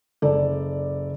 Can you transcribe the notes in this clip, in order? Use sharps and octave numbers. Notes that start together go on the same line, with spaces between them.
F#1 A4 D5